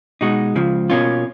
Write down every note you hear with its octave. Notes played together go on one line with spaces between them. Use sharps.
B2 G#3 D#4 F#4
C#2 C#3 F3
B2 A#3 C#4 F4